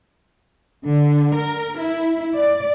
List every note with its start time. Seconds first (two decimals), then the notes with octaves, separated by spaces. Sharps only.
0.86 D3
1.36 A#4
1.78 E4
2.36 D5